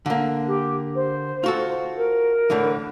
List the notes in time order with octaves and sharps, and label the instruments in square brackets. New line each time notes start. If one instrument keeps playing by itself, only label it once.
[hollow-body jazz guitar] D3 A#3
[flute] G4
C5
[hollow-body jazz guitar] F4 F#4 A4
[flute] A#4
[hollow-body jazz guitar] A2 D3 E3